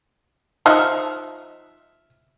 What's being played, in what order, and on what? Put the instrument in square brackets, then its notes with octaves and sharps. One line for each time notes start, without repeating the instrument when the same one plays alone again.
[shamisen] F3 D#4 D#5 [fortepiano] E5 F6 F#6